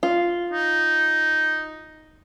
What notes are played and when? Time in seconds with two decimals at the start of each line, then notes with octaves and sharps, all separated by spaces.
0.03 F4
0.51 D#4